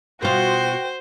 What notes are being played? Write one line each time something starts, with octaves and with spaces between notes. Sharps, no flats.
B2 F4 F#4 C5 G5